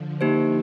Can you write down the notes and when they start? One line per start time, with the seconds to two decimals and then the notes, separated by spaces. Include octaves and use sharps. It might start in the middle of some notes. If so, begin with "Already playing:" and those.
Already playing: D3 F3
0.21 A#3 D#4 G4 C5